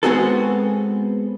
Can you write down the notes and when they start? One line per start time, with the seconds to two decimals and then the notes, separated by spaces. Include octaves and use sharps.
0.03 G#3 B3 C4 F#4 G#4 A4